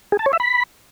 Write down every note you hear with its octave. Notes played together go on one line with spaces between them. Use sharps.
G#4
A5
C#5
E5
B5